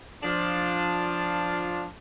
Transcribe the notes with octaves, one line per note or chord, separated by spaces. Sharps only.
F3 D4 F4